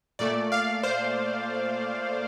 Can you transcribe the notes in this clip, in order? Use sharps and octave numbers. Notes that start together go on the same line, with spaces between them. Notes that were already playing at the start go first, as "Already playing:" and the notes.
A#2 A3 D5
F5
C5